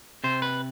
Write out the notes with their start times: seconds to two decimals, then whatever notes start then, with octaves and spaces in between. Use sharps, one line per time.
0.24 C3 C5
0.42 B4